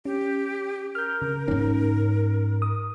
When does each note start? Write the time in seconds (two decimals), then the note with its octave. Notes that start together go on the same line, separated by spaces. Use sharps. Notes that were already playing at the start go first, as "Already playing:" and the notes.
0.05 C#4 G4
0.95 A#4 F6 G6
1.22 C#3
1.48 G#2 C#4 D#4
2.62 D#6